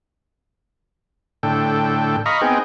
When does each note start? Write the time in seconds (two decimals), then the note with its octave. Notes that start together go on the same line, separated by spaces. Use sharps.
1.43 A2 D3 A4 G5
2.26 D#5 F5 A#5 B5 C#6
2.41 B3 C4 D#4 G#4 G5